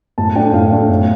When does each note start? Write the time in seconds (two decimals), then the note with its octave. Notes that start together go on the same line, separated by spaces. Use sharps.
0.18 A2 A5
0.36 A3 D4 G5
0.54 A2 F5
0.72 A3 D4
0.90 A2